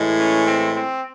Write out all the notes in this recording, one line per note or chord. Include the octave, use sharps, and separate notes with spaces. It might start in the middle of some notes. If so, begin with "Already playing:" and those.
Already playing: A2 E3 G#3
C#4
C4
C4